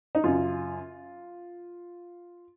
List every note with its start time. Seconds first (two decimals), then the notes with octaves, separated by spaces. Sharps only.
0.15 D#4
0.24 F#2 C#3 F4